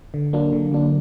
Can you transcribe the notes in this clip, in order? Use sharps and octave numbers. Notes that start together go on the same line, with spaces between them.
D3
F#3 A#3 D4
D3
F#3 A#3 D4